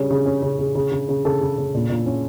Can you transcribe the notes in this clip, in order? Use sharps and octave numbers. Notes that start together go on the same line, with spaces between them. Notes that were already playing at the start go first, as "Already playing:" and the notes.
Already playing: C#3 G3 C#4 C#5
C#3
C#4
C#3
C#3
C#3
C#3
C#3
C#3 A4
C#3
C#3
A#2
A#2
C#4